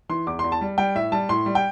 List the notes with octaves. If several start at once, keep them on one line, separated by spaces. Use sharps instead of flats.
E3 C6
E2 D6
E2 C6
A5
G3
G3 G5
A2 E5
G3 A5
A2 C6
G3
G5